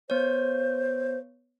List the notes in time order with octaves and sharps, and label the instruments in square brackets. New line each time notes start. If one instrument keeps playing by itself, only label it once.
[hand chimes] B3 C#5 [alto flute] C5